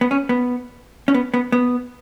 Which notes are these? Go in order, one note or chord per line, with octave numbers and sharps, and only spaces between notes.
B3
C#4
B3
C#4
B3
B3
B3